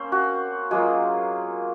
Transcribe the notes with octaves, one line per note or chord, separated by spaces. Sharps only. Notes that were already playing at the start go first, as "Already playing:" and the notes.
Already playing: A#3 C4 C#4 C5
F#4
F#3 G#3 A#3 F4 G#4